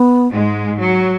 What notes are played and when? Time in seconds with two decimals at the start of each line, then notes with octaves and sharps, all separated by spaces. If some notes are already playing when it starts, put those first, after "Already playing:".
Already playing: B3
0.33 G#2 G#3
0.80 F#3